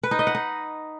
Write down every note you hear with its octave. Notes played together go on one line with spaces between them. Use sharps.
B4
D#4
D#5
F#5
D#4